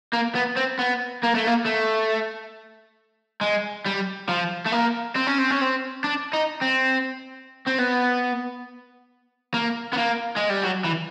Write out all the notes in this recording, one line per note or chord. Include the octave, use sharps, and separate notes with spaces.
A#3
B3
C4
B3
A#3
A3
A#3
A3
G#3
G3
F3
A3
A#3
C4
C#4
C4
C#4
C4
D4
D#4
C4
C4
B3
A#3
B3
A#3
G#3
G3
F#3
E3